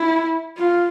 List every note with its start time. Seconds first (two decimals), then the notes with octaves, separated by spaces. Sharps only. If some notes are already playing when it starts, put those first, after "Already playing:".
Already playing: E4
0.57 F4